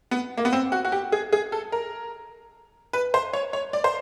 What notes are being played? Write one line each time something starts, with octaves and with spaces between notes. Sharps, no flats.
B3
A#3
B3
C4
F#4
F#4
G4
G#4
G#4
A4
A#4
B4
C5
C#5
C#5
D5
C5